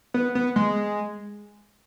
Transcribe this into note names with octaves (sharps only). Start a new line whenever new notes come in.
B3
B3
G#3